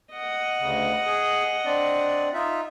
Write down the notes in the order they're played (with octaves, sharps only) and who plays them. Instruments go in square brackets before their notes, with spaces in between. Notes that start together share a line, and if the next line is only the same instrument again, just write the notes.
[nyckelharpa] D#5 F#5
[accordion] D2 C#3
G#4
C4 D4 D5
D#4 F4 E5